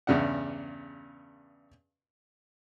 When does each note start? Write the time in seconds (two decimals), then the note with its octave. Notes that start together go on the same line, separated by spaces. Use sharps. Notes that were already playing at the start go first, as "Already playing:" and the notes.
0.07 E2 G2 C#3 D4 F#5